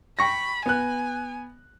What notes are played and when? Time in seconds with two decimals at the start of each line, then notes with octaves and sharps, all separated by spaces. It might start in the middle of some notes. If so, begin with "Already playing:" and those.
0.19 G5 B5 C#6 A#6
0.66 B3 G#5 F#6